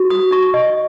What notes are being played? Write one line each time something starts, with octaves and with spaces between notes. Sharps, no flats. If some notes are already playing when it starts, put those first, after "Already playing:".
Already playing: F#4
D#6
D#4 C#6
D#5